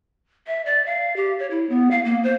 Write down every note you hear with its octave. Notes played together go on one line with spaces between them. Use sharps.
E5
D5
F5
G4
C#5
E4
B3
F5
A#3
C5